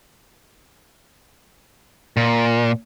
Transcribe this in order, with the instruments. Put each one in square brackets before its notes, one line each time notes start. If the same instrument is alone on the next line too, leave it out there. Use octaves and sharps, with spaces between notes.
[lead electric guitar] A#2